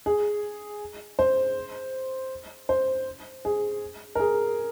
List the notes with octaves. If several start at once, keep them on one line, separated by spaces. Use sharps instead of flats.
G#4
C5
C5
G#4
A#4
G#4